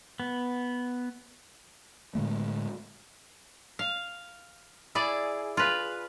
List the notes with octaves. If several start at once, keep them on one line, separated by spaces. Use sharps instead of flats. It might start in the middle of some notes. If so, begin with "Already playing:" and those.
B3
A2 D3 G#3 A3
F5
E4 G#4 D5
F4 B4